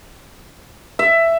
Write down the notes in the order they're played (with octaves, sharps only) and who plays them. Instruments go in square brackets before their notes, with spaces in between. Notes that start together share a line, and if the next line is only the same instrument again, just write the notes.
[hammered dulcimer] E5